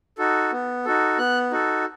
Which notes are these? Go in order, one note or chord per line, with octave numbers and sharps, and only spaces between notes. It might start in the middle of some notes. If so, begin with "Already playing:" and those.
D#4 F#4 A4
B3
D#4 F#4 A4
B3 F#6
D#4 F#4 A4